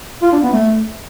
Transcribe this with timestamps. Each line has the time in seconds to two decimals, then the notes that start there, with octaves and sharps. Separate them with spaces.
0.22 F4
0.32 D4
0.42 B3
0.52 A3